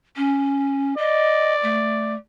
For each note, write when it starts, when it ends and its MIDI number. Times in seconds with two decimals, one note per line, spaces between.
0.17 0.94 61
0.98 2.18 74
0.98 1.54 75
1.63 2.15 57